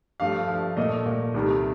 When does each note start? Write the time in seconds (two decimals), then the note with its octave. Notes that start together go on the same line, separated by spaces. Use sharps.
0.20 G2 F3 A3 F5
0.48 G2 F3 A3
0.77 A#2 A3 D#5
1.06 A#2 A3
1.34 C2 C3 D#3 A3